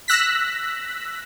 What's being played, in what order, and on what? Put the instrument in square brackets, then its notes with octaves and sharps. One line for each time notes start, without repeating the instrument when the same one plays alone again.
[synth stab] E6 F#6 A#6 B6